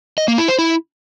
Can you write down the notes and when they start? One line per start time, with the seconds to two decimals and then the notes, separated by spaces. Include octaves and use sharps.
0.18 D#5
0.28 A#3
0.38 E4
0.48 C5
0.59 E4